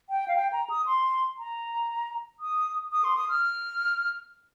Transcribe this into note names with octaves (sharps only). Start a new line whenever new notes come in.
G5
F5
G5
A#5
D#6
C6
A#5
D#6
D#6
C6
D#6
F6